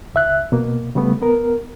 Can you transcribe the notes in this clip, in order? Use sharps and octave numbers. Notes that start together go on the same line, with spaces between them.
C#2 E5 F#6
B2 A#3
C#3 G3 A3 B3
B3 A#4